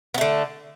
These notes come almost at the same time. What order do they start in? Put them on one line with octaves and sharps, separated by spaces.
B3 A3 D3